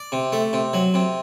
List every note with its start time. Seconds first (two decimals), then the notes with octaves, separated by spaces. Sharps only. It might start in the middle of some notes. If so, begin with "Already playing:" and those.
Already playing: D5
0.12 C3
0.32 A3
0.53 C3
0.73 F#3
0.94 C3